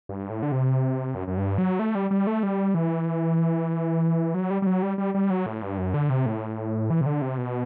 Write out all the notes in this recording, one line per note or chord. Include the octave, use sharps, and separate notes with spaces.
G2
A2
D3
C3
F#2
F#2
G2
F#3
A3
G3
G3
A3
G3
E3
F#3
G3
G3
F#3
G3
G3
G3
F#3
A2
G2
F#2
D3
C3
A2
E3
C3
D3
C3
B2